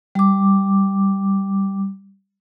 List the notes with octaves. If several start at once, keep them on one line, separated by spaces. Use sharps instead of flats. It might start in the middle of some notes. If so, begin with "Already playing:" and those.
G3 D6